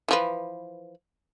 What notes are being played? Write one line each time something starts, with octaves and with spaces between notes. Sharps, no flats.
E3 F3 B4